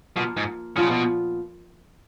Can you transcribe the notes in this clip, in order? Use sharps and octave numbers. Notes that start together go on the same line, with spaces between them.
B2 F3 A#3 F4 A#4
G#2
A#2 C#3 F3 B3 F4
B2